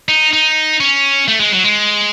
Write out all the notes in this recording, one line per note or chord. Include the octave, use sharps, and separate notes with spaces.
D#4
D#4
C#4
A3
G#3
F#3
G#3